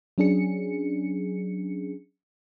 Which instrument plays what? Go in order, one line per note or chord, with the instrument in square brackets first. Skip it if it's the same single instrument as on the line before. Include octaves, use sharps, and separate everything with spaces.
[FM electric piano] F#3 C#4 D4 G#4 C#7